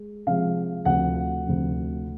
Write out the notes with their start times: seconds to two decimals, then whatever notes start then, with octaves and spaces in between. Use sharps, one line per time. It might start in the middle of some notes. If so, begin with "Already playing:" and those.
Already playing: G#3
0.26 C3 F3 G#3 F5
0.85 D2 C3 F3 F#5
1.45 D2 C3 F3